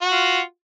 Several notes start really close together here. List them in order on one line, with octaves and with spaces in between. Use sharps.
F#4 F#5 F4